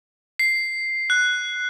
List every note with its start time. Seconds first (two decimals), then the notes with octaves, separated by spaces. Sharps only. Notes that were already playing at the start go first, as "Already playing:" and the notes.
0.39 C7
1.10 F#6